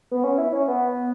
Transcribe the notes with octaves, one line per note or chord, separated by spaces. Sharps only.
B3
C#4
E4
C#4
B3